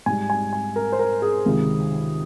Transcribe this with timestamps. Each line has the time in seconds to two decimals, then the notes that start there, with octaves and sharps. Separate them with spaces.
0.06 G#2 G3 G#5
0.30 G#5
0.53 G#5
0.76 A#4
0.92 C5
0.99 A#4
1.22 G#4
1.46 C#2 C3 D#3